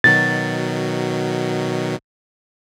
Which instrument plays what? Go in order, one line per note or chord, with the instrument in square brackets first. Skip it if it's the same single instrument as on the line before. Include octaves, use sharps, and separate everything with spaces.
[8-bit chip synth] B2 D#3 F#3 [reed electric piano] A6